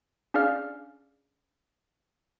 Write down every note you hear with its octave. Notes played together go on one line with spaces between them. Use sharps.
C#4 D4 G#4 D5 F5 F6